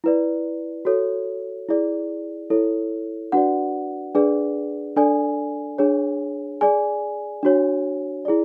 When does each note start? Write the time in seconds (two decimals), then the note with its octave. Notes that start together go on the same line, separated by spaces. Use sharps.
0.04 E4 B4 D5
0.85 F#4 A4 C#5
1.69 E4 G#4 D5
2.50 E4 A4 C#5
3.32 D4 F#4 B4 D5 F#5
4.15 D4 G#4 B4 D5
4.96 D4 A4 D5 G#5
5.78 D4 G#4 C#5
6.61 G#4 D5 G#5
7.43 D4 F#4 C#5
8.25 E4 G#4 D5